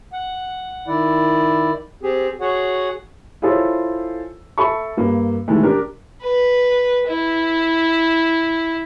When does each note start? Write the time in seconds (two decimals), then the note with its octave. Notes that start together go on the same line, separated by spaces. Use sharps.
0.13 F#5
0.87 D#3 E4 D5
2.03 C4 G4 G#4
2.41 F#4 G#4 C#5 F#5
3.42 E4 F4 G#4 A4 C5 C#5
4.58 A4 E5 A5 B5 C#6
4.97 G2 A#3
5.48 C3 D#3 E3 G#3 A3
5.63 D4 G4 A#4
6.22 B4
7.08 E4